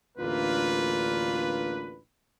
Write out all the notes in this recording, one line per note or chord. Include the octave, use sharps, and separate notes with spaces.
A1 D2 A#3 D4 F4 B4